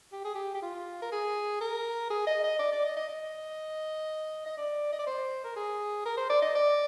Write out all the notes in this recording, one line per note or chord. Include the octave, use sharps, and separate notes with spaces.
G4
G#4
G4
G4
F4
A#4
G#4
A#4
G#4
D#5
D#5
D5
D5
D#5
D#5
D#5
D#5
D5
D#5
D5
C5
A#4
G#4
A#4
C5
D5
D#5
D5